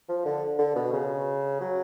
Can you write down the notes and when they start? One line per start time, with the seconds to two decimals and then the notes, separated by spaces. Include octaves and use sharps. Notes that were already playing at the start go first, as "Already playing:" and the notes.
0.09 F3
0.25 D3
0.59 D3
0.76 B2
0.93 C#3
1.61 F#3